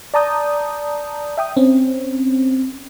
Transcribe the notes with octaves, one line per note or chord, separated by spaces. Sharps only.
D5 A5 A#5 D#6 G6
E5 G5 D#6
C4 C#4